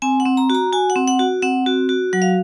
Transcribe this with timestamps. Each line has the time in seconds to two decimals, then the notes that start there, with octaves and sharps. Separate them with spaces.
0.02 C4 G#5
0.20 F#5
0.26 C4
0.37 A#5
0.50 F#4
0.55 A#5
0.72 F#4 G#5
0.90 F#5
0.96 C4
1.08 F#5
1.19 F#4
1.42 C4 F#5
1.66 F#4
1.89 F#4
2.13 F#3 F#5
2.22 F5